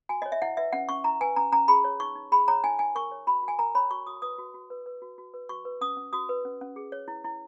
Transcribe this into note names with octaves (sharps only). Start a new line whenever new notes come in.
F#4 G#5
C#5 D#5
E5
E4 F#5
B4 E5
C#4 F#5
C#4 C#6
E4 A#5
B4 G#5
C#4 A#5
C#4 A#5
G#4 B5
C#5
D#4 C#6
D#4
G#4 B5
C#5 A#5
D#4 G#5
D#4 G#5
A#4 C#6
C#5
F#4 B5
F#4
G#5
A#4 A#5
C#5 B5
F#4 C#6
F#4 D#6
B4 D#6
F#4
F#4
B4
B4
F#4
F#4
B4
F#4 C#6
B4
C#4 D#6
C#4
F#4 D#6
B4
C#4
C#4
G#4
C#5
E4
E4